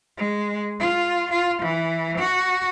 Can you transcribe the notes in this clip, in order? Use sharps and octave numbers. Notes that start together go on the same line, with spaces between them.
G#3
F4
F4
E3
F#4